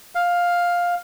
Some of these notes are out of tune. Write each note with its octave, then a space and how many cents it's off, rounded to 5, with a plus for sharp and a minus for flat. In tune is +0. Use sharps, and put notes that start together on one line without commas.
F5 +10